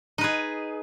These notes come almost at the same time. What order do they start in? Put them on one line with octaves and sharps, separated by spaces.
D#4 B4 G#4